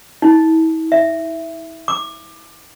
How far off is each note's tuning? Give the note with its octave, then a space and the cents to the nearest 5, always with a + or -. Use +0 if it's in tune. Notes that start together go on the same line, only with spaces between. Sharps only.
E4 -40
E5 +10
D6 +25